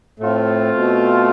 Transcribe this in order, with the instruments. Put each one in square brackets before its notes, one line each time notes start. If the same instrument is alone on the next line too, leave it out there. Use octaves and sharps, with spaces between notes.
[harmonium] A2 [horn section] A3 C4 F4
[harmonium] B2